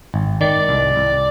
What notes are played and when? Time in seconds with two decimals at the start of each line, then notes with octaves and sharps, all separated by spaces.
0.14 G#1
0.41 D#3 D5
0.69 C2
0.96 C2